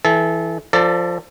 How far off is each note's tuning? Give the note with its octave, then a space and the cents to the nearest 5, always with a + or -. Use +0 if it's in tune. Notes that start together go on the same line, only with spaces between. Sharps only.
E3 +0 A4 -25
F3 +0 A4 +30 D5 +0